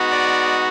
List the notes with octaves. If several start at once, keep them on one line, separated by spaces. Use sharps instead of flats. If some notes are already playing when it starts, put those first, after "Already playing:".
Already playing: G#3 B3 D#4 F#4
D5